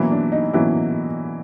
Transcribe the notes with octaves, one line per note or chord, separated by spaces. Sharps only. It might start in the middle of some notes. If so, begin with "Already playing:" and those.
Already playing: B2 E3 F#3 A#3 C#4 E4
D4
D#4
B2 E3 F#3 A#3 C#4 E4